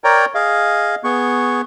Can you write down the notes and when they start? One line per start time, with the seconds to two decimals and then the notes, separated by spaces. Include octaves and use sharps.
0.04 A#4 C#5 D5 G5 A#5
0.35 G#4 D#5 F5
1.04 B3 G#4 C#6